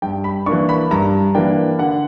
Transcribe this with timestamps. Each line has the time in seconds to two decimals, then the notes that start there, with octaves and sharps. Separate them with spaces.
0.02 G2 G5
0.24 B5
0.46 E3 A#3 D4 C#6
0.69 B5
0.91 G2 A#5
1.34 E3 A#3 D4 G5
1.79 D3 F#5